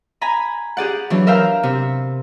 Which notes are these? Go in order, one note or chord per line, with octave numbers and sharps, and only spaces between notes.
G#5 A#5 B5
G4 G#4 D5 F#5
E3 F#3 D4
A#4 E5 F5 G5 A#5
C3